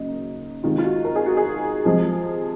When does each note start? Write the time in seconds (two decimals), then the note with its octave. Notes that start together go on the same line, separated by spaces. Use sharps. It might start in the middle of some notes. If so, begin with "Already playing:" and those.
Already playing: F#2 C#3 F#3 A#3 D#4
0.64 C3 D#3 G#3 F4
0.78 F4
0.84 F#4
1.05 A#4
1.16 G#4
1.26 F#4
1.37 G#4
1.85 C3 F3 G#3